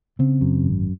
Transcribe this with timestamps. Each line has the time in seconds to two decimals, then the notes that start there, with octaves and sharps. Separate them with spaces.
0.19 C#3 C4
0.41 F#2
0.64 G#1